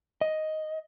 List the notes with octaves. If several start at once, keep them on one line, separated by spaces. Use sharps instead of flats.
D#5